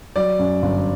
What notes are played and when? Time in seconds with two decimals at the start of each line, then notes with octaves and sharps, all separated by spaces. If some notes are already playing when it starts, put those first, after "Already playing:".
0.16 F#3 D5
0.39 F#2
0.62 G1